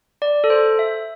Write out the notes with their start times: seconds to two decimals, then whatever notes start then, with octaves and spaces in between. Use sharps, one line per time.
0.22 D5
0.44 A4
0.50 C5
0.79 E5